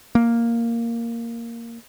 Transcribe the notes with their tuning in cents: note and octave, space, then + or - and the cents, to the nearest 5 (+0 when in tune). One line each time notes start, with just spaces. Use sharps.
A#3 -5